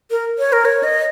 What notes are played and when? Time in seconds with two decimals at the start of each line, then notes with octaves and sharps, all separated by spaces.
0.11 A#4
0.39 C#5
0.53 A#4
0.65 C#5
0.83 D#5